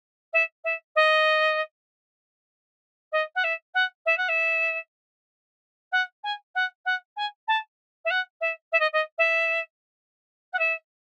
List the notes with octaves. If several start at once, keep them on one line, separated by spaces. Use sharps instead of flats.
E5
E5
D#5
D#5
F#5
E5
F#5
E5
F#5
E5
F#5
G#5
F#5
F#5
G#5
A5
E5
F#5
E5
E5
D#5
D#5
E5
F#5
E5